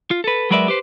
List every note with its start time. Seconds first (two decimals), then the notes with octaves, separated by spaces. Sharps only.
0.11 F4
0.24 A4 B4
0.50 F#3 G#3 A#4 B4 D5 E5
0.68 G4 B4 C5